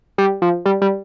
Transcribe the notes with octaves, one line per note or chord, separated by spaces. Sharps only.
G3
F3
G3
G3